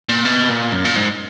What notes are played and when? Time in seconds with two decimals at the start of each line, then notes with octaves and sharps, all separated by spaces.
0.09 A#2
0.25 B2
0.50 A#2
0.73 F#2
0.85 A#2
0.96 G#2